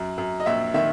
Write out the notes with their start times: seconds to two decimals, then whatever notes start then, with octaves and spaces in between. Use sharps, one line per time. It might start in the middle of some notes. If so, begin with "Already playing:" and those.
Already playing: F#2
0.18 F#2
0.40 D#5
0.46 A#1 E5
0.74 D#3 E5